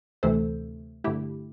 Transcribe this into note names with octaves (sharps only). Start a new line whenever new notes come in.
D2 C3 E3 A3 A4 C5
G2 D3 A3 E4 G4